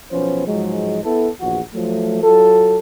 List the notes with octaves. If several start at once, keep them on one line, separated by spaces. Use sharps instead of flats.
B1 F3 B3 C#4 C5
G#2 F3 F#3 G#3
B3 E4 A4
A#1 E2 F#4
F3 F#3 A3
F#3 F4 A4